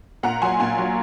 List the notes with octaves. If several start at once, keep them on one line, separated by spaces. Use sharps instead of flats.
A#2 F#5 A#5
F#3 G#5 C6
A#2 G#5 C6
F#3